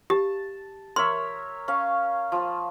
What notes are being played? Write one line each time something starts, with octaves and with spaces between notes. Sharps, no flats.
G4 A5
A#4 C#5 E5 C6
C#4 F5
F3 A5